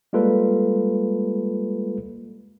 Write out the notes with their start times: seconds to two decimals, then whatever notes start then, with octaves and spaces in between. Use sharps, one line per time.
0.13 G3 G#3 A#3 F4 A4 B4